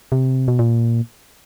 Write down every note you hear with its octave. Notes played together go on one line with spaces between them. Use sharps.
C3
B2
A#2